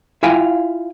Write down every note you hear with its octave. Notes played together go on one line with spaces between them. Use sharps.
E4 F4 F5 G5 G#5